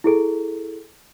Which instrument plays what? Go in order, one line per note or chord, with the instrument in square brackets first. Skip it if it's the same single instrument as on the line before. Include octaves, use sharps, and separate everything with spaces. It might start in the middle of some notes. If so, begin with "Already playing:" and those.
[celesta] E4 G#4 A4